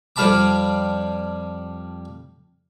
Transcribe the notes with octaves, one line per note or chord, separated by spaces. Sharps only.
F2 G3 F5 A5 B5 D6